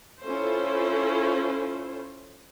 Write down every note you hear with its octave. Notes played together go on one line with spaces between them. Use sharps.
C#4 E4 F4 A4 C5